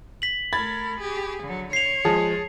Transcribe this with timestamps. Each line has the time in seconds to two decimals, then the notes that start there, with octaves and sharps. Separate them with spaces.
0.22 B6 F#7
0.53 A3 A#4 B5 G#6 A6
1.00 G4 G#4
1.44 D3 F#3
1.73 C#5 C7 F7
2.05 F3 G#3 G#4 A5